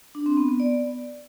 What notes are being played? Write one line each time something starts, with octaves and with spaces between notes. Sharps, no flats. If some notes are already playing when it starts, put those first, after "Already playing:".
D4
C4
B3
B3
D5